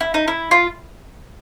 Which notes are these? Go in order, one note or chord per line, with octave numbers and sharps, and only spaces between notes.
E4
D#4
E4
F4